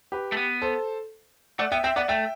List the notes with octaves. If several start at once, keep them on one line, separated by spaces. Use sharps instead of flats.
G4 B4
A3
B3
A4 C5
A3 D5 F#5
B3 E5 G5
C4 E5 G5
B3 D5 F#5
A3 E5 G5